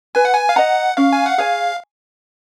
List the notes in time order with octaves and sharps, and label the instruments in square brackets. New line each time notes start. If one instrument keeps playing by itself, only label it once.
[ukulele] B4 [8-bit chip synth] G#5
[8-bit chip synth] F#5
G#5
F5
[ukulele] D#5 A#5 [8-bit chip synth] F#5
[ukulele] C#4 [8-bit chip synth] F5
[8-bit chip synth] G#5
F#5
[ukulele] G#4 C#5 G#5 [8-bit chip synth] F5